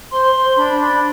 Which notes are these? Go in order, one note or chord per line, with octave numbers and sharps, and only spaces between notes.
C5 C6
C5
D4 B5
D4